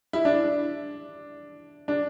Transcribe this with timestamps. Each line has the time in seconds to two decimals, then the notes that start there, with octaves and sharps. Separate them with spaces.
0.13 E4
0.25 D4
1.88 D4